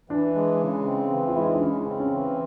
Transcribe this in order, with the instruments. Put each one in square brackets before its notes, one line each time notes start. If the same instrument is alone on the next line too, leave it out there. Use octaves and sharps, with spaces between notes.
[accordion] E3 [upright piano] D4
[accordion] G#3
C#3
C4
E3
[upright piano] F4
[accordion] G#3 [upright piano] E4
[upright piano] D#4
D4
[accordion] C#3 [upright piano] C#4
[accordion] C4
[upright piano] C#4
[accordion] E3